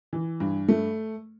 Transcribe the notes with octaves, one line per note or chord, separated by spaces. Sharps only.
E3
G2
A3